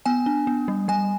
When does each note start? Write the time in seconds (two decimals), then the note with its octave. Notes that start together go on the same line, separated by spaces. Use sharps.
0.06 B3 G#5
0.26 D4
0.47 B3
0.68 G3
0.88 G3 G#5